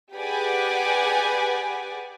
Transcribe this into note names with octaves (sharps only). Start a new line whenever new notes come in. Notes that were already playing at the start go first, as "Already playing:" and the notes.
G4 G#4 B4 D5 F#5 G#5